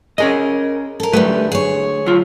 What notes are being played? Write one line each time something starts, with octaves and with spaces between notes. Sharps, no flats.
C#4 G#4 A#4 D#5
A4 A#4
D2 E3 G3 A3 B4
G#4 C#5
F#3 F4